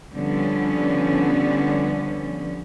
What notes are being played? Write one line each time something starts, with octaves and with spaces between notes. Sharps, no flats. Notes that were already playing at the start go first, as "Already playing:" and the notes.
D3 F3 G3 B3 C#4